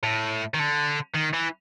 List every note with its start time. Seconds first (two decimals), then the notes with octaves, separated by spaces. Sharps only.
0.03 A2
0.54 D#3
0.59 D3
1.14 D#3
1.33 E3